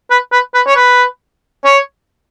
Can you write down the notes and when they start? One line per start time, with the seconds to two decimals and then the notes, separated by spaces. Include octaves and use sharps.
0.11 B4
0.32 B4
0.54 B4
0.67 C#5
0.77 B4
1.65 C#5